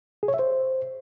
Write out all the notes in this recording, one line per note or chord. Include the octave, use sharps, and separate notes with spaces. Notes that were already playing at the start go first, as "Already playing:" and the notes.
G#4
C#5
E5
C5